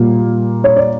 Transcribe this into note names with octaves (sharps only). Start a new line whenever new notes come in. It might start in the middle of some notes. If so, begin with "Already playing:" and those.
Already playing: A#2 G3 A#3
C#5
D5